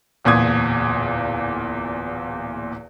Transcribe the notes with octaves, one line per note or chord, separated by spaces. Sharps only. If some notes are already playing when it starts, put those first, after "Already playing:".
D1 E2 A#2 D#6 G#6